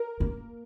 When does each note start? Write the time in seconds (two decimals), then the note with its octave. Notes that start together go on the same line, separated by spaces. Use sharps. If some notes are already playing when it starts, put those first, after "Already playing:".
Already playing: A#4
0.20 A#3